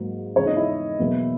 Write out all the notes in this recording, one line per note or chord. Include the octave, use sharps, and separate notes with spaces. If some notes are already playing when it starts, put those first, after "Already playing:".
Already playing: G#2 F#3 A#3
E2 C#3 G#3 C#5
D#4 D#5
E4 E5
E2 B2 F#3 A#3